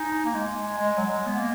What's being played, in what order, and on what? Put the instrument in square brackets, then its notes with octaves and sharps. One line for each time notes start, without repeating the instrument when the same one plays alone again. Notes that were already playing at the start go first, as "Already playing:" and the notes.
Already playing: [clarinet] D#4 [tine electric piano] G#5
[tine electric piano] A#5
[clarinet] A#3
[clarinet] G#3 [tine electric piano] G#5
[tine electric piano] G#5
[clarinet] G#3 [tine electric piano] G#5
[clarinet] F#3 [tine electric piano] F#5
[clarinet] G#3
[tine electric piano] G#5
[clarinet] B3
A#3